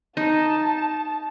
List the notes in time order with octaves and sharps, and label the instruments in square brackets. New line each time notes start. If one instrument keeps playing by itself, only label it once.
[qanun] D#4 [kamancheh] A5